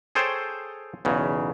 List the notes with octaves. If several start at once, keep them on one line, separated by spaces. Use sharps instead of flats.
G#4 A4 C5 C#5 G5 A5
B1 E2 C#3